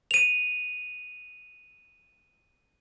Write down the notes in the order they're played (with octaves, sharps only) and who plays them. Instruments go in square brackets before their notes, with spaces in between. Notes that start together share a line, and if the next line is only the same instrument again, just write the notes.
[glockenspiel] D#7 F7